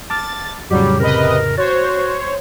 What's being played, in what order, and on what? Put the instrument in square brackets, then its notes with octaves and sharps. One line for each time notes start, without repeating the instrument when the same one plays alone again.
[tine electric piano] A5 D6 F6 [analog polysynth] A6
[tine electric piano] F2 A2 C#3 [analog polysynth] F#3 G3 [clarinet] G4
[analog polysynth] C3 B4 D#5 [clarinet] A#4
[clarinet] F#4 [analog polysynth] C5 C#5 [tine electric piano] A6